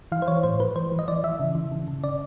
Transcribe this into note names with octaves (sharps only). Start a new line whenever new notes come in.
E3 F5
C5
E3 C#5
A2 C5
E3 B4
E3 C5
E3
D#5
E3 D5
E3 E5
C#3
E3
C#3
C#3
C#3 D5